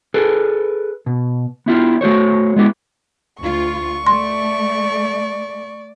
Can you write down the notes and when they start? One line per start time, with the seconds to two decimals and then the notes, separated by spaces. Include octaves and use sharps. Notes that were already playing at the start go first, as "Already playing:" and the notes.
0.14 G#4 A4 B4
1.06 B2
1.66 B3 E4 F4 G4
2.01 A3 F#4 C5 C#5
2.56 G#3 B3 E4 G4
3.41 D2 F4 C#6
4.07 A3 D5 C6